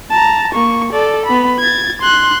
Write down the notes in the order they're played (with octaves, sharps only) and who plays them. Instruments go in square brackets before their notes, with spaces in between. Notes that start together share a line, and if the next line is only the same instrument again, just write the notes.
[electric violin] A5 A#5
A#3 C#6
A4 D5
B3 B5
G#6 A6
C6 F#6